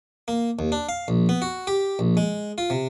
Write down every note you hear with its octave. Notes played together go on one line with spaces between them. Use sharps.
A#3
D#2
D4
F5
A#1
B3
F#4
G4
A#1
G#3
F4
C3